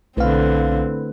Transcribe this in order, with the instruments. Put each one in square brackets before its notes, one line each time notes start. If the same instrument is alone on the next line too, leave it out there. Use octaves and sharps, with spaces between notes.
[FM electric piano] B1 F5 [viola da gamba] D3 C4 [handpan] A3 E4 B4